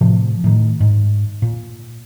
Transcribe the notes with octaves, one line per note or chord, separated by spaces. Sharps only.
A2 C3 F3
A2 D#3
G#2
A#2